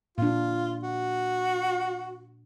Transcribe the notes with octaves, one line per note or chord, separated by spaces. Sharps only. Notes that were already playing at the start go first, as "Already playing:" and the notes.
A#2 D4 F4
F#4